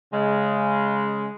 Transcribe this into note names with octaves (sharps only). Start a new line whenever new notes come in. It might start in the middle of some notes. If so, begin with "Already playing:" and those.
C#3 G#3